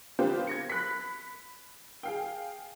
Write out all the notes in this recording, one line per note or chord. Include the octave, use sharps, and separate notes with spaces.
B3 C4 D4 F4 G4 C5
G#6 A#6 C#7
B5 F#6 B6
G#4 F5 G5